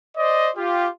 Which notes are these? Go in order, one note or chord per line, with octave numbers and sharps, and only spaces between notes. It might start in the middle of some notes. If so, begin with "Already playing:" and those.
C5 D5 D#5
F4 G4